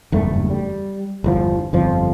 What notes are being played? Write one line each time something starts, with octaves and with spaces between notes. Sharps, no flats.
F#1 E2 G2 A3
G3
G1 E2 F3
G1 F2 F3